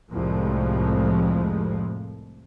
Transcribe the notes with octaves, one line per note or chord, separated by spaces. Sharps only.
C2 F2 A2 F3 G#3